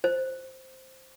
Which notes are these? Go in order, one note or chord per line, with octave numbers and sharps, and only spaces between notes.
C5